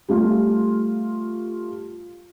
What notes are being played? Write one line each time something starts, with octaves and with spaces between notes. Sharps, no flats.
G3 A3 F4